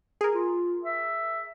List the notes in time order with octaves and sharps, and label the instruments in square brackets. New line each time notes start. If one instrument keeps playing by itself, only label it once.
[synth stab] G#4 A#4
[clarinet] F4
E5